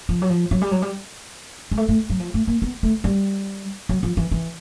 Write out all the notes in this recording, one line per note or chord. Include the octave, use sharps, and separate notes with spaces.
F3
F#3
F3
F#3
G3
F#3
G3
G#3
A3
A3
F#3
F3
A3
A#3
B3
A3
G3
F#3
F3
E3
E3